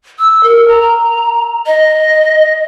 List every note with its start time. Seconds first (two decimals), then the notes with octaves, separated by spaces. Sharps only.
0.19 E6
0.43 A#4
0.68 A#5
1.67 D#5